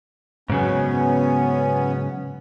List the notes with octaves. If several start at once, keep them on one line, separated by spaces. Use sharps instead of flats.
G#2 C#3 F#3 B3 C#4